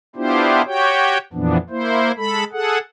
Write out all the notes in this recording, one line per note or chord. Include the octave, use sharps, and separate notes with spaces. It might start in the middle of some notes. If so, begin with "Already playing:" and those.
B3 D4 E4 F4 G4 C5
F#4 G4 C#5 G5
F2 A#2 E3 F3 B3 D4
A#3 E4 C5
G#3 A4 B5
G#4 A4 F#5